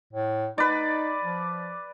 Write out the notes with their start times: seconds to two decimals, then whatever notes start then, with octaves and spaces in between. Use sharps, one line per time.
0.13 A2
0.58 D#4 B4 D5
1.24 F3